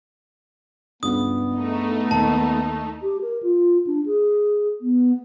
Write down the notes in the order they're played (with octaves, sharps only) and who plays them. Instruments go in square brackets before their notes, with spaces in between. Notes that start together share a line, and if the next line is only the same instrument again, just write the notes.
[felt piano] C#2 G2 [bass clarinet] B3 [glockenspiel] D#6
[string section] A3 D#4
[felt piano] D#2 [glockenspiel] A5
[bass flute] G4
A#4
F4
D4
G#4
B3